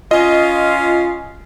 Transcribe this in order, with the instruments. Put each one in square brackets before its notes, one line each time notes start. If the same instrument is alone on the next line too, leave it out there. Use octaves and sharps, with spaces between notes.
[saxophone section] C#4 F4 [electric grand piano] D#5